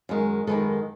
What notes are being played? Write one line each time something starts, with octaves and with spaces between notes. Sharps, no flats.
F#2 D#3 G#3
F#2 D#3 G#3 A4 B4